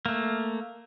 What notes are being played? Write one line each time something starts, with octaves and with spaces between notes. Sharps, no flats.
A3 A#3